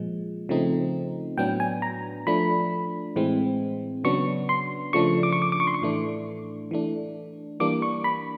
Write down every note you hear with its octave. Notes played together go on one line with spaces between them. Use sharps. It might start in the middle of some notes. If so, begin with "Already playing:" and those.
Already playing: A#2 F3 G#3
C#3 F3 A3 C4 D#4
A2 F#3 B3 D4 G5
G#5
A#5
F3 A3 D4 B5
A2 E3 G#3 C4
C#3 F#3 B3 D4 C#6
C6
C#3 F3 A3 D4 C#6
D6
C#6
D6
D6
C#6
C6
C#6
A2 E3 A3 D4
E3 A3 D4
E3 G3 A#3 D4 D6
C#6
B5